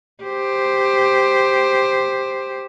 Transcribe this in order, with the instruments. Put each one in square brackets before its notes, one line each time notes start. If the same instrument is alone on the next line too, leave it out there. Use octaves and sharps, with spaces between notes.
[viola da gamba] G4 C5